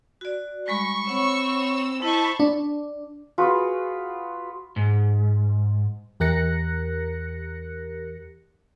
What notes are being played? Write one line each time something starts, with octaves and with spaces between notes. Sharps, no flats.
F#4 D5
G3 G#3 B5 C#6
C4 C#5 F#5 B5 E6
E4 C5 D#5 A5 B5 C#6
D4
F4 F#4 G#4 B4
G#2
E2 G4 A#4 F#6 A#6 C#7